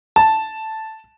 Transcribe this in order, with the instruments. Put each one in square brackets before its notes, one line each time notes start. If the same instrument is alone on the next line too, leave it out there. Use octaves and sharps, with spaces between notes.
[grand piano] A5